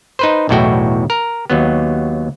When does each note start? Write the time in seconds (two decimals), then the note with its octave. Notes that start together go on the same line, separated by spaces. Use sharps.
0.19 D#4 B4 C5
0.49 B1 E2 A2 E4 F#4 G5
1.10 A#4
1.50 D#2 F#3 B3